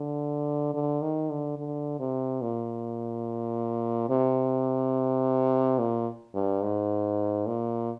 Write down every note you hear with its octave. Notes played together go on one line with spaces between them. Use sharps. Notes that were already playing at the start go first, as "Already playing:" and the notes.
Already playing: D3
D3
D#3
D3
D3
C3
A#2
C3
A#2
G2
G#2
A#2